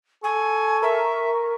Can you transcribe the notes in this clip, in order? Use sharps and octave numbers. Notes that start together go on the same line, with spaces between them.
A4 G#5 C#6
A#4 E5